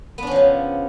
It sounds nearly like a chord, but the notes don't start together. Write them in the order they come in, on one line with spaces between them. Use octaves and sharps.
B3 D4 C#4 F3 C#3